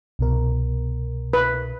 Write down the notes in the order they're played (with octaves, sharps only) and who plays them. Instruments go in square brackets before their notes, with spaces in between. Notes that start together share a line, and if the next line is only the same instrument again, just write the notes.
[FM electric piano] C2 B2 A#4
[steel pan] B4